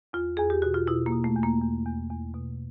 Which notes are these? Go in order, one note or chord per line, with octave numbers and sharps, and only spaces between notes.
E2 F4
E2 G#4
G4
B2 F#4
F4
B2 E4
A#3
B2
A3
E2
A#3
E2
E2
E2
B2